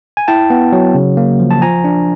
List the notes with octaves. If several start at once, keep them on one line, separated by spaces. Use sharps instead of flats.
G#5
E4 G5 A5
B3
F#3
C#3
A#3
F3
A5
F3 G#5 A#5
D4